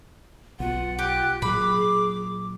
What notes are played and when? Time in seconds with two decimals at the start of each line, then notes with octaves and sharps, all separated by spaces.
0.60 B1 F4 F#5
0.99 G4 F#6
1.42 A#2 F#3 G#4 B5 D6